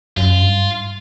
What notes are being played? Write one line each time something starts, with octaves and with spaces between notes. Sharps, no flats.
F#2 F4
G2
G#2